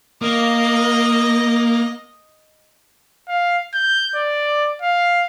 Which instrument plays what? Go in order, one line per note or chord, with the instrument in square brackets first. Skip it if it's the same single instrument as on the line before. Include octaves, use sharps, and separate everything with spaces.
[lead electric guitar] A#3 [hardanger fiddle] D#5
[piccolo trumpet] F5
G6
D5
F5